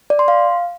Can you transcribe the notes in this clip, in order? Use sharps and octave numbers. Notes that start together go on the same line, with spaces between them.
D5
C6
F5